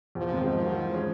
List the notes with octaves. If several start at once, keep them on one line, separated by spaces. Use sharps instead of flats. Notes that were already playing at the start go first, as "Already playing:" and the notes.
E2 F3
C3 D#3 G#3 C4
G#2 F3
D#3 F#3
E3
G#3 C#4